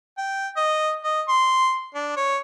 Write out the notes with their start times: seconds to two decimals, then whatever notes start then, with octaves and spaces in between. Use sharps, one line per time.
0.18 G5
0.57 D#5
1.04 D#5
1.28 C6
1.95 D4
2.16 C#5